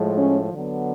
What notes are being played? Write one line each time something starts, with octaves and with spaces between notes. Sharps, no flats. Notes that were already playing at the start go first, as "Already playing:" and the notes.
Already playing: A2 F3 G#3
C#4
D3 F#3 B3